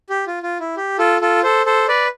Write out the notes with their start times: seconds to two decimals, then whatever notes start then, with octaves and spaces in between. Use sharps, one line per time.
0.10 G4
0.27 F4
0.43 F4
0.60 E4
0.77 G4
0.99 F4 A4
1.21 F4 A4
1.43 A4 C5
1.66 A4 C5
1.88 B4 D5